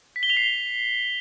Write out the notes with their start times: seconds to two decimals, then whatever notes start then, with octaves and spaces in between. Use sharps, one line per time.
0.16 B6
0.23 G7
0.30 F7
0.37 C7